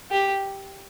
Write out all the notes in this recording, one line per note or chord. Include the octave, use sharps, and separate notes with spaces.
G4